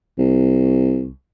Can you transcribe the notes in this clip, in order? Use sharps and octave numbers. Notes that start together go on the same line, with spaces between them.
C2